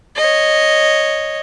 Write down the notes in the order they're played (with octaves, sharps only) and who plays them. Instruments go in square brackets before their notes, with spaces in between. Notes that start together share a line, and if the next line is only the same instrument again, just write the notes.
[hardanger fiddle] C#5 D#5